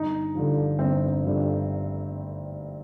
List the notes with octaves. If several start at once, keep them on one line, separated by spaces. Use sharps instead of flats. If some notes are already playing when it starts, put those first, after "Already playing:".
Already playing: G1 D#4
G2 D3 F3
G1 C4
G2 D3 F3